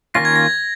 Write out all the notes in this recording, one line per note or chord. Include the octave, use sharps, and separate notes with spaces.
D#3 A#3 C#4 F4 A#6
G#6
A#6